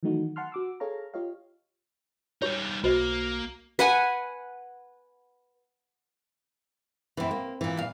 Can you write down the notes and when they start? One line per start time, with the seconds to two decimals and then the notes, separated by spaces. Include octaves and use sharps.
0.03 D#3 E3 F#3 A3 D#4 F#4
0.36 F#5 A5 C6 F6
0.52 F#4 D6 E6
0.80 G#4 A4 C#5 F5 A#5
1.14 F4 G4 C#5 D#5 F5
2.42 G3 D#4 G4 C#5
2.84 B1 A#3 F#4 C5 D#5
3.79 B4 F#5 G#5
7.17 F#2 E3 C4 B4
7.31 A#3
7.61 A#2 E3
7.77 G2 F5